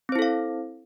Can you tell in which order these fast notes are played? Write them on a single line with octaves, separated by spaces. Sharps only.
C4 C5 E4 A4 F5